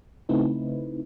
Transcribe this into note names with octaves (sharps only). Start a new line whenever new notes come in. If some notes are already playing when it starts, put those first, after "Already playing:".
C#3 A3 C4 D#4 E4 B4